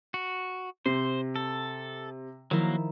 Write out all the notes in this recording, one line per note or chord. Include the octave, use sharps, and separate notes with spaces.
F#4
C3 C5 C7
A4
D#3 F3 F#3 A#3 E4